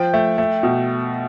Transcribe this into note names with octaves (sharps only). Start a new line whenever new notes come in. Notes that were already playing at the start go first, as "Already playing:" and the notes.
Already playing: F3 G5
A3
A3
B2